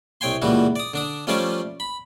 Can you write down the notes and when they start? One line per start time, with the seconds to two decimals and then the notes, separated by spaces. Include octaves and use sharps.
0.21 C2 C#5 G5 G#5 C6
0.42 C#2 A#2 E3 G3 F#4
0.76 D5 D#6
0.94 D3 D4 D#6
1.27 F3 G3 A3 C#4 F4 D5
1.80 B5